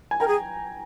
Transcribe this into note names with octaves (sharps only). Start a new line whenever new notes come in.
G#5
A#4 G5 A#5
G#4